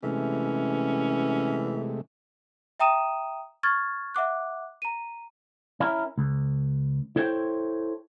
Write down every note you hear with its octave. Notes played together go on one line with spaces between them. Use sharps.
C3 E3 G#3 A3 C#4
E5 G5 A#5 D#6 D#7 E7
C#6 F6 G#6 A6
E5 F#5 D6 F#6
A#5 D#7
C#4 E4 A#4
C#2
E4 A4 C5 C#5 F#5 G5